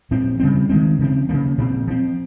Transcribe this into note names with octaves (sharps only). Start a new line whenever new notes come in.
A#2 F3 C4
C#3 G3 C4
D#3 G#3 C4
C#3 F3 C4
C#3 F3 A#3
A#2 F3 C4
F3 C4